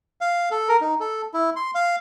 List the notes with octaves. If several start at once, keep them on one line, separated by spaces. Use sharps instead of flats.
F5
A4
A#4
D#4
A4
E4
C6
F5